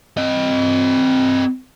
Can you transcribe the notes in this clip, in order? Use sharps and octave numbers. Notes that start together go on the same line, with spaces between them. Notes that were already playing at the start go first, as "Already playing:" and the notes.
C4 D#5